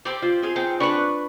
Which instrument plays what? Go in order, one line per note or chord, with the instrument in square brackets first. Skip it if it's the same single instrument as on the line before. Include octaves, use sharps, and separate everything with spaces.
[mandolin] C4 G4 D5 [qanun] C5
[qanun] F4 C5
C4 G#4 F5
[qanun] C4 [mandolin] D#4 G5
[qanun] D4 B4 A5 [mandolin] C#6 F#6